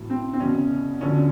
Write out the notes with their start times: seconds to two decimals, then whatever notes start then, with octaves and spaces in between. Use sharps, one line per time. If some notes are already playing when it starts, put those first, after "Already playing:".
Already playing: B1 A2 E3
0.10 C4
0.33 C4
0.40 F#1 E2 B2 C#4
1.01 D2 D3 F3 C#4